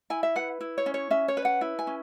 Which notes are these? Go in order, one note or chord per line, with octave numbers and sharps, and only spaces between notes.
E4 G#5
E5
B4 F#5
E4
C#5
C#4
C#5
C#4 E5
C#5
B4
F#5
E4
G#5
C#4